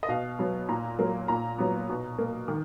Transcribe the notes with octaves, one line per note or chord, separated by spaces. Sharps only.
D#5
B2 F5
F#3 B3
A#2 A#5
F#3 A#3
A#2 A#5
F#3 B3
B2
A#3
D#3